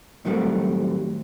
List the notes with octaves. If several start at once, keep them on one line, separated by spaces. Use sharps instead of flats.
A2 D#3 F#3 G3 A3 C4